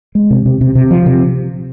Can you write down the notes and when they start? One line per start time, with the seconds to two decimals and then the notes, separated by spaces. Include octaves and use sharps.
0.15 G#3
0.30 C3
0.46 C3
0.61 C3
0.75 C3
0.91 F3
1.06 C3